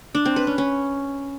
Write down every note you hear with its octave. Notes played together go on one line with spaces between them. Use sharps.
D4
C4
B4
C#4
C#4